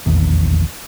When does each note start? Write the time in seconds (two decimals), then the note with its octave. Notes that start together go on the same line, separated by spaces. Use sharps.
0.06 F1 A#1 E2 D#3